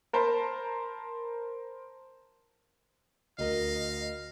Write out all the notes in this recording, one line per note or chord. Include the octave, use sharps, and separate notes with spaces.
A#4 C5 A5 B5
D2 A#4 D#5 F5